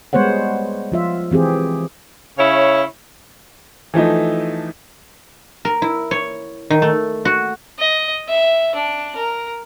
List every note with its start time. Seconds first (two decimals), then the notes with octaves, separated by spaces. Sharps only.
0.13 G3 G#3 B3 C5 C#5 F#5
0.92 F3 F4 E5
1.31 E3 C4 G4 G#4
2.38 C#3 E4 C#5
3.94 E3 F3 A3 D#4
5.65 A#4
5.82 E4
6.11 C#5
6.70 D#3
6.82 A3
7.25 F#4
7.79 D#5
8.28 E5
8.75 D4
9.16 A#4